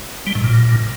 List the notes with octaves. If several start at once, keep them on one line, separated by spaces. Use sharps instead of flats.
G3
A2
A#2